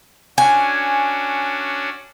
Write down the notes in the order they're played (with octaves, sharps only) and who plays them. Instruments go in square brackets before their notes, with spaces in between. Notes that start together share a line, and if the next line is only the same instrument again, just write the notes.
[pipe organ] C#4 D4 F#4 [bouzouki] G#5